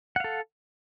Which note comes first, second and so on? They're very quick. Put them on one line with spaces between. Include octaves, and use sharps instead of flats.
F#5 F5 A4